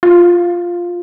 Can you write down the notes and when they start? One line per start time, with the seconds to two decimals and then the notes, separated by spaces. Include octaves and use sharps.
0.03 F4